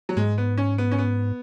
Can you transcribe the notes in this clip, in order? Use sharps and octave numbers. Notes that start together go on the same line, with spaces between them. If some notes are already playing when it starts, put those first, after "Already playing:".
F#3
G#2 G#3
B3
C#4
B3
C#4
B3